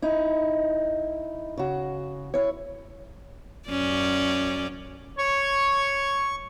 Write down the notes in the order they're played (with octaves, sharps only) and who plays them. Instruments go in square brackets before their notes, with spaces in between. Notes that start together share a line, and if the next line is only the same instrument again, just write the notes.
[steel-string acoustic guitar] D#4 E4
C#3 F#4
E4 C#5
[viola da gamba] F#2 C#4 D5
[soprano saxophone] C#5 [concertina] C#6